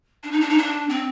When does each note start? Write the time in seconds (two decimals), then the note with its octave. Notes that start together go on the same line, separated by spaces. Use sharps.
0.23 D4
0.32 D#4
0.41 D4
0.49 D#4
0.58 D4
0.89 C4